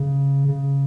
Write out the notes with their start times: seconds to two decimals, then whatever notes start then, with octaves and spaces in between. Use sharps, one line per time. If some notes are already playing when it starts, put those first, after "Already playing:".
Already playing: C#3
0.48 C#3